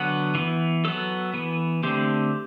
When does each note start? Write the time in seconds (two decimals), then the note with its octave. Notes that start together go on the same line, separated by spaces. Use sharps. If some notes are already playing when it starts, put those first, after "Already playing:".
Already playing: D3 F#3 B3 F#5
0.35 E3 B3
0.85 F#3 B3 A4
1.34 E3 B3
1.83 D3 A3 C4 G4